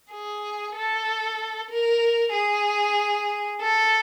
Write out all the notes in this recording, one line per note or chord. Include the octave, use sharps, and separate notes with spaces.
G#4
A4
A#4
G#4
A4